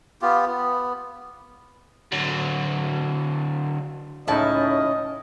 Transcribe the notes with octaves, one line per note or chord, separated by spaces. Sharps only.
B3 F4 G4
B3
D3 F#3
C#2 A2 C#4 D#4 E4 D#5 A5